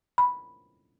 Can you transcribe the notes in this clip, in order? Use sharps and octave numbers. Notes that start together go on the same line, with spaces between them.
B5